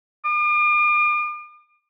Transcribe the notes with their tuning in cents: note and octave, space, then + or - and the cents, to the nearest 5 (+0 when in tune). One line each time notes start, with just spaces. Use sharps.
D6 +45